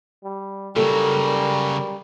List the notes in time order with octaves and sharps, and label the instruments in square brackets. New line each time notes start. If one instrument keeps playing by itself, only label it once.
[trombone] G3
[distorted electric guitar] C#3 F#3 [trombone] G3 [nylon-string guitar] A4 [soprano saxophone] A#4